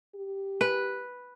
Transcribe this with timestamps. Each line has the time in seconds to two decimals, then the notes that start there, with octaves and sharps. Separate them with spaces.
0.15 G4
0.61 B4